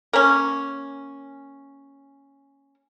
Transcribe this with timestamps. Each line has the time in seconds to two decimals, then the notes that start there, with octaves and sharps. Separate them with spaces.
0.13 A#3 C#4